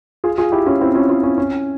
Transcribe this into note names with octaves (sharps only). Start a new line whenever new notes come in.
F4 G#4
F4 G#4
E4 G4
C#4 F4
C4 E4
C#4 F4
C#4 F4
C#4
C#4